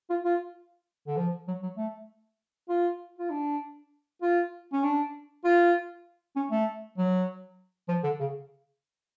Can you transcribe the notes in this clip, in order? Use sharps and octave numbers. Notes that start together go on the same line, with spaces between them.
F4
F4
D3
F3
F#3
F#3
A3
F4
F4
D4
F4
C#4
D4
F4
C#4
A3
F#3
F3
D3
C#3